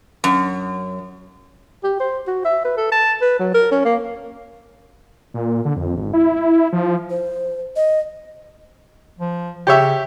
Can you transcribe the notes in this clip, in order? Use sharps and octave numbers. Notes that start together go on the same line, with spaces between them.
F#2
G4
C5
F#4
E5
B4
A4
A5
B4
F#3
A#4
C#4
A#3
A#2
D3
F2
G#1
E4
F3
C5
D#5
F3
C#3 G4 C#5 E5